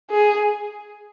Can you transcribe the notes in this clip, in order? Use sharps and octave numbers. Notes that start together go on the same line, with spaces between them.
G#4